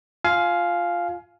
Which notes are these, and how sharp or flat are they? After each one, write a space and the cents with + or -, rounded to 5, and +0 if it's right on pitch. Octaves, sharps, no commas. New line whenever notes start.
F4 +0 F5 +0 G#5 +25